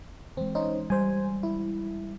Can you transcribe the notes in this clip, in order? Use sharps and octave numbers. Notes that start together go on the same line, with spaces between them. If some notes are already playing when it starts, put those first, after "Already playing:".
E3 G#3 C4
C#4 D#4 C5
G3 C5 G#5
E4